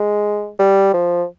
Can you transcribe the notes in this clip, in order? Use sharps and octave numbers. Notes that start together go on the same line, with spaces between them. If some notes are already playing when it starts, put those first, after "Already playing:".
Already playing: G#3
G3
F3